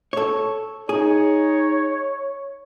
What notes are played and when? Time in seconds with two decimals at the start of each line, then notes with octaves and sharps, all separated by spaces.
0.13 A4 C#5
0.89 D#4 G#4 C#5